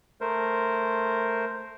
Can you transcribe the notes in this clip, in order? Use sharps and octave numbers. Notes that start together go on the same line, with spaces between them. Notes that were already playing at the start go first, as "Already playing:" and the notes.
A3 A#4 C5